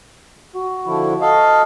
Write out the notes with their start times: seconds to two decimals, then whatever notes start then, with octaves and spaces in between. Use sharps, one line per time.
0.56 F#4
0.86 D3 F3 E4
1.21 A4 D#5 F5